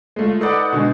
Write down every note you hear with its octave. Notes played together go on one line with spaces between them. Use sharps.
G#3 A3 F4
D#4 A4 B4 D5 F#5
B2 D3 G#3